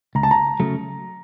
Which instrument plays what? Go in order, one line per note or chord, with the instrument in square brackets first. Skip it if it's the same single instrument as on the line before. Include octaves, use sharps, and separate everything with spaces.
[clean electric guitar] C#2 [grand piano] A#5
[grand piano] A5
A#5
[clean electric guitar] C#3 F#3 A3